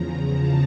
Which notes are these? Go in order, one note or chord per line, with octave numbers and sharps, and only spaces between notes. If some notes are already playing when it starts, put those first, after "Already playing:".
Already playing: E2 C#3 F3 A#5
A5